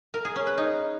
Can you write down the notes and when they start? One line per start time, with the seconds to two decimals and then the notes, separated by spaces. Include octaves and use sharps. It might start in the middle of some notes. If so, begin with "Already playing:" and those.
0.14 A#4
0.25 G#4
0.36 C#4
0.47 B4
0.58 D#4